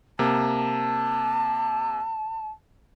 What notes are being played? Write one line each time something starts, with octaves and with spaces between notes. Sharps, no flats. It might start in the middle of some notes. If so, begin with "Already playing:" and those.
C3 A#3 A5